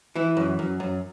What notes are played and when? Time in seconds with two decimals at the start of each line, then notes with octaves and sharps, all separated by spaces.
0.15 E3 E4
0.37 F#2
0.59 F#2
0.80 F#2